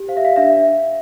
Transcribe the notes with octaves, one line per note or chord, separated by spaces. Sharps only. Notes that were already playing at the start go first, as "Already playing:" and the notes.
Already playing: G4
C5 F5
E5
F5
D4 E5